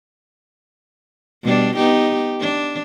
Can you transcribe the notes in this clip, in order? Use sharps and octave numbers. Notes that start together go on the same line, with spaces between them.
B2 G3 D4
B3 D#4 G4
D4